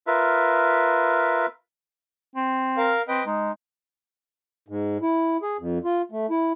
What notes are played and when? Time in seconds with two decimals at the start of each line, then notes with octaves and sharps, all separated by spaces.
0.07 F4 A#4 B4 E5
2.35 C4
2.77 A#4 F5
3.08 C4 B4 D#5 G5
3.26 G#3 D#4
4.68 G#2
5.02 E4
5.42 G#4
5.59 F2
5.84 F4
6.12 A3
6.30 E4